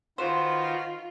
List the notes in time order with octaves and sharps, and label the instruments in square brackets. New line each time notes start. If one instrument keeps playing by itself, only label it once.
[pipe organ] D#3 F#4 B4 [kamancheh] F4 [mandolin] C5